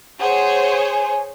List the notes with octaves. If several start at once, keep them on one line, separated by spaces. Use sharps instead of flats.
G#4 C5 C#5 F#5
G#5